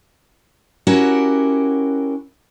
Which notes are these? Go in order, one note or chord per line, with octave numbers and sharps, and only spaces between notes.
C#4 E4 F#4 G4 A#4 F#5